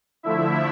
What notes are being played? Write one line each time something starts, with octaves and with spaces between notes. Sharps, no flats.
D3 F3 A3 E4 E5